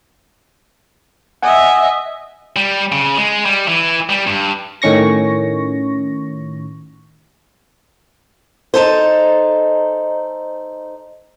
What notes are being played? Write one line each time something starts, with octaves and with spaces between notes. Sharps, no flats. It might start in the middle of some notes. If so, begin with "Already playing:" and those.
D#5 E5 F#5 G#5
G3
C#3
G#3
G3
E3
G3
G2
A2 D#3 C#4 C#6 A#6
D#4 A4 C5